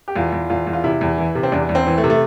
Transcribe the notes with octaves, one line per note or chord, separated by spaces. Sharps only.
G4
E2 F4
E2
E2 F4
E2
F4
C3 E4
E2
E3
C3
C4
E2 D4
E2
C4
E3
A3
C3
A3